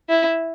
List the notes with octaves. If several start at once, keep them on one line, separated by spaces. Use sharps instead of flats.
E4